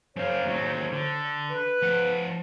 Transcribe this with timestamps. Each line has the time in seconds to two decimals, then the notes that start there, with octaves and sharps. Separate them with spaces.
0.16 F#2 C5 C#5 F5
0.46 D#2 F#3
0.92 D3
1.50 B4
1.82 F3 F#5